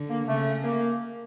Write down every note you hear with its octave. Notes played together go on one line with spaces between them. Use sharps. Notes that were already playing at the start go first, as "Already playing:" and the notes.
Already playing: D3
A#3
C#3 A3
A#3